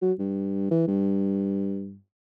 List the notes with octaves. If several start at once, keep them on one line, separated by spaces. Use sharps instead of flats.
F#3
G2
E3
G2